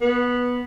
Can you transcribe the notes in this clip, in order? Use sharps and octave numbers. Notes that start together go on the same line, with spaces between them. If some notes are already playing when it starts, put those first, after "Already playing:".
B3